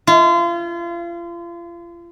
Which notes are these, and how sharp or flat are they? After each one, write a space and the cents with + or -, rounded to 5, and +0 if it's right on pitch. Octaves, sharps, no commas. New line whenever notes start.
F4 -35